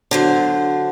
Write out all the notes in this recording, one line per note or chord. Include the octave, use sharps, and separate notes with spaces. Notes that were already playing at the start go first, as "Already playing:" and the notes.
D3 F#3 C5